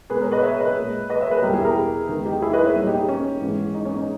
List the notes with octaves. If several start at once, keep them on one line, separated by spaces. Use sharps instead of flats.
B2 G#3 G#4 B4
A#4 C#5
B4 D#5
C#5 E5
B4 D#5
A#2 G#3
B4 D#5
C#5 E5
G#4 B4
E2 B2 G3 G4 A#4
E4 G#4
G4 A#4
E2 D#3 G#3
D#4 G4
E4 G#4
B4 D#5
C#5 E5
A#2 G3
D#4 G4
D#4
C#4
G#2 E3 G#3
D#4
C#4
D#4